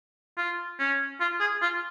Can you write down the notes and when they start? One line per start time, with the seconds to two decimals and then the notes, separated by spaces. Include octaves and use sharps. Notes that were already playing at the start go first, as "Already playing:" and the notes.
0.38 F4
0.79 C#4
1.20 F4
1.40 G#4
1.62 F4